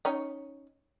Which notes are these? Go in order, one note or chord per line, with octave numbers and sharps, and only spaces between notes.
C#4 D#4 C#5